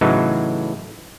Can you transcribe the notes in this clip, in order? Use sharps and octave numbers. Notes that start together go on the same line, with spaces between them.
A2 C#3 E3 F#3 D#4